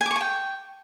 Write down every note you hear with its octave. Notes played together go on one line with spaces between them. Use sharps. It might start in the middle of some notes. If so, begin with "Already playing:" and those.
G#5
D6
C#6
G#5
G5